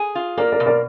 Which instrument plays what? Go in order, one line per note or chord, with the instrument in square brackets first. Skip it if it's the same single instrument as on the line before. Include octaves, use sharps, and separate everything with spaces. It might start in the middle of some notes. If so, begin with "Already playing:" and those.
Already playing: [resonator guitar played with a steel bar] G#4
F4
[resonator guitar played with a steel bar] A#3 [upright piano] A#4 D5
[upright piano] A#4 D5
[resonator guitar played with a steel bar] B2
[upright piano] A#4 D5